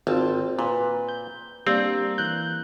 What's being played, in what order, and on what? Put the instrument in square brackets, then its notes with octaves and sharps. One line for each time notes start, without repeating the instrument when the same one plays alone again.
[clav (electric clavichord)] G#1 [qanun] C4 F4 A5
[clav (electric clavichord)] A#2 [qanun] B4
[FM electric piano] G6
[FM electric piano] G3 D4 [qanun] A#3 [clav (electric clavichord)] C4
[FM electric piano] E3 F#6 G6